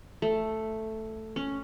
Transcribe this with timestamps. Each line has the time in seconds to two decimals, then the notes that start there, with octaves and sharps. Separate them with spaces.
0.22 A3
1.36 C#4